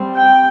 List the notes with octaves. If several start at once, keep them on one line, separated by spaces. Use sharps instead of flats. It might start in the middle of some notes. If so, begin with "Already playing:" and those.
Already playing: G3 C4
G5